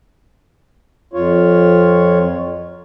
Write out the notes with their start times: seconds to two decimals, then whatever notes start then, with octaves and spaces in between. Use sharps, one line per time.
1.13 F2 F4 C#5